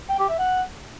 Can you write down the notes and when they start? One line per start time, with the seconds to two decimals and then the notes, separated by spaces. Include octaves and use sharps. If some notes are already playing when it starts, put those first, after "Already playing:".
0.09 G5
0.19 G4
0.29 E5
0.39 F#5